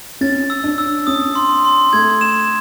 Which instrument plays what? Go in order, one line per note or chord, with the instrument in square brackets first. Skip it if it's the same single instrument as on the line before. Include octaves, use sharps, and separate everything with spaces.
[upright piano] C#4 [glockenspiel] A6
[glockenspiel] E6
[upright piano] D4
[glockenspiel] E6
[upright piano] C#4 [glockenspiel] D#6
[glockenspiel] C6
C6
[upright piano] A3 [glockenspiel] G#6
[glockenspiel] E7